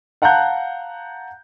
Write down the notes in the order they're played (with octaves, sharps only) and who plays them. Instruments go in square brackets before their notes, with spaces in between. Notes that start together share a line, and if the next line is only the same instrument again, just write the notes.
[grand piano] F5 F#5 A5 A#5 F#6 G6